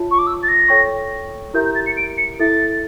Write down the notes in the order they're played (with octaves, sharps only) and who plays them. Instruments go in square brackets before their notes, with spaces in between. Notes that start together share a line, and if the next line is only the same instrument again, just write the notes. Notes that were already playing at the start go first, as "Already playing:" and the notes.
Already playing: [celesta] F4 C#5 E5 A5
[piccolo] C#6
D6
E6
A6
A#6
[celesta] A4 C#5 G5 C#6
[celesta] E4 G4 A#4 E5 A#5 [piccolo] G6
[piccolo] G6
A6
C#7
D7
C#7
[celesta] E4 A4 E5 [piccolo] A6